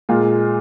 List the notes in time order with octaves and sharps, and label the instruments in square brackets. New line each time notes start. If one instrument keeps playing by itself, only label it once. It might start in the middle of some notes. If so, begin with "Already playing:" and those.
[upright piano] A#2 G#3 F4 A#4